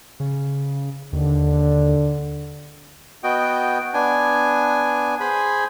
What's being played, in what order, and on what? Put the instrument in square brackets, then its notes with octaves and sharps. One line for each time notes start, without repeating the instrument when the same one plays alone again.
[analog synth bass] C#3
[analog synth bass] D#2 [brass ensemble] D3
[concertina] B3 F#4 D#5 G5
B3 D4 G#5
G#4 C5 G#5 B5